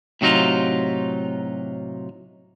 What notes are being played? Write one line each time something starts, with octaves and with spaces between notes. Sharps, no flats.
A2 C3 F#3 D#4 F4